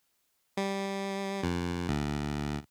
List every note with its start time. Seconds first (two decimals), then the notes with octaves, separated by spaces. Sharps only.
0.57 G3
1.43 F2
1.88 D2